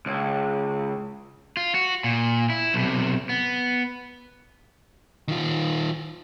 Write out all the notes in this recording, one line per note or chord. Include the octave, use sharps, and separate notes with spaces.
C#2
F4
F#4
A#2
E4
B1 C3
B3
D#3 F4